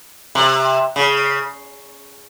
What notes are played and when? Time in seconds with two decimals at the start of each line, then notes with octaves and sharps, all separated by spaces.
0.35 C3
0.96 C#3